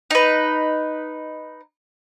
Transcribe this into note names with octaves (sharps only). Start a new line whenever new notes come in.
D#4 B4